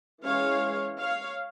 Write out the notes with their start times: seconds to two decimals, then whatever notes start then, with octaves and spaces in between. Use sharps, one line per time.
0.24 E3 G#3 C#4 C#5 F5
1.00 C#5 F5